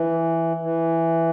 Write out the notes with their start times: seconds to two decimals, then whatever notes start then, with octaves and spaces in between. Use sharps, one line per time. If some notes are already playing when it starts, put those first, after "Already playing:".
Already playing: E3
0.62 E3